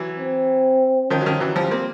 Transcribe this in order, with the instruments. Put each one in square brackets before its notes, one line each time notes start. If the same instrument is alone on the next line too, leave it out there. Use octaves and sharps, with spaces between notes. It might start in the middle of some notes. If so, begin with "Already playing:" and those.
Already playing: [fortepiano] E3 F#3
[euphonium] C4
[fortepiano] D#3 F3 [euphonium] C#4
[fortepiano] F#3
D#3 F3
E3 F#3
F3 G3
A#3 C4